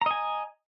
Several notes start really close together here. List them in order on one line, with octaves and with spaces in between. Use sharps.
A#5 D#5 G#5